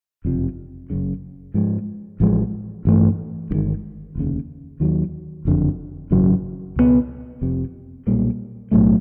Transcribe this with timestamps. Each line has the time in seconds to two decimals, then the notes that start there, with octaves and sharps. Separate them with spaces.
0.25 F#1 F2 C3 F3
0.90 F#1 F#2 C#3
1.54 G#2 F3 G#3
2.20 A1 A2 F3 G#3
2.85 A1 G2 E3 A3
3.50 G1 G2 D#3 G#3
4.15 F1 D#2 C#3
4.80 D#2 D#3 F#3
5.45 F#1 F2 D3
6.11 G#1 F#2 C#3 F#3
6.76 C#2 B2 F#3 B3
7.41 F1 F2 C3
8.07 B1 A#2 G3 A#3
8.71 B1 A2 F#3 A3